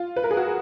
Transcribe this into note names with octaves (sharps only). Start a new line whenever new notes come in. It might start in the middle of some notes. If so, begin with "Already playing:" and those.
Already playing: F4
B4
A#4
G#4
F#4